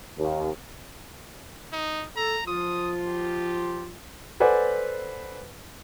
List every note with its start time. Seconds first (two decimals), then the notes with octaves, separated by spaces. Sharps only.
0.17 D#2
1.72 D#4
2.16 A4 A#5
2.47 F3 F4 D#6
3.06 G4
4.40 A4 B4 C5 D5 F#5 G#5